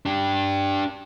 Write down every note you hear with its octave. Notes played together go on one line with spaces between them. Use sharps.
D4 G4